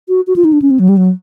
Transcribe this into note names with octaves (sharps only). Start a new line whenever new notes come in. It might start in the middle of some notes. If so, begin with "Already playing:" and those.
F#4
F#4
F4
D#4
D4
C#4
C4
F#3
G3
F#3